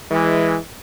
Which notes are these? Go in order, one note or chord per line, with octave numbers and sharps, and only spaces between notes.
E3 G#3